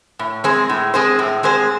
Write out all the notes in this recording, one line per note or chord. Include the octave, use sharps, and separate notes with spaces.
A2
G#3 C4 G#4 C5
A2
G#3 C4 G#4 C5
A2
G#3 C4 G#4 C5